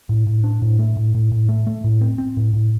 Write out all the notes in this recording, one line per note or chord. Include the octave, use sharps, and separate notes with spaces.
A2
A2
D4
A2
A3
A2
A2
A2
A3
A3
A2
C4
C4
A2
A2